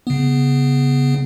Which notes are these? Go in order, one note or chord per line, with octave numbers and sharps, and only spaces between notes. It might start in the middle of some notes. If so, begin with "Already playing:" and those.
C#3 B3